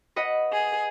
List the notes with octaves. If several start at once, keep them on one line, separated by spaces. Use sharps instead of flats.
B4 D#5 F#5
G#4